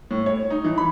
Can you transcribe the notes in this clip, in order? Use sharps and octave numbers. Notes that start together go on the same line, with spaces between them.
A2
C#5
D#4
E3
B5